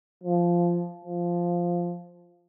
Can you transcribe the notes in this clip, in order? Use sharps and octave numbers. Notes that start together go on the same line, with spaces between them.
F3
F3